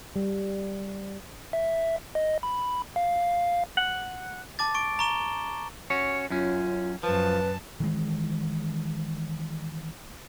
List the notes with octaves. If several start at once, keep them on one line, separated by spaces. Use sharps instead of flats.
G3
E5
D#5
B5
F5
F#5
A5 D6 A6
C#6 D7
A#5 C#6 E7 G7
C#4 F#4 C#5
F#2 C#4 F4
F#2 F3 B4 A5
D#3 E3 G#3